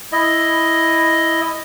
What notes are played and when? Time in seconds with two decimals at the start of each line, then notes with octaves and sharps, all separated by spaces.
0.12 E4 D#5